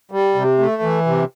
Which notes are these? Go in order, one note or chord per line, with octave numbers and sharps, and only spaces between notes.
G3
C3
A3
E3
C3